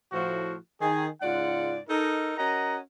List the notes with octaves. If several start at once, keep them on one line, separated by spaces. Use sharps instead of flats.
A2 F3 F#4
D#3 G#4
G#2 C#3 F4 D5 F#5
D#4 A4 A#4
C#4 F#4 A#4 D#5 F#5 A#5